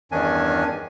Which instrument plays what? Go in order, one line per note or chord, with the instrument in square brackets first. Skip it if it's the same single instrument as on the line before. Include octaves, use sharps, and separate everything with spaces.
[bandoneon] E2 G2 D#3 C#4 D4 G#5